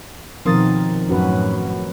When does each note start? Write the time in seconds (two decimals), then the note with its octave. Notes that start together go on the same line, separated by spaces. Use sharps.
0.45 B2 D#3 F3 C4 A#4 D#6 A6
1.08 F#2 A2 C#4 F#4 B4